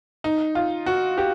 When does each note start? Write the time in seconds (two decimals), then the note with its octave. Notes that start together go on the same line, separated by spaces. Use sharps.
0.24 D#4
0.55 F4
0.86 F#4
1.18 G4